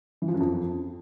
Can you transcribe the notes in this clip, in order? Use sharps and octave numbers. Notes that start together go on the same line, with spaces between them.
E3
F3
F#2
F2